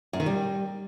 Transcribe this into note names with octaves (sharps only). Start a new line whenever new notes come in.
F#2
D#3
G3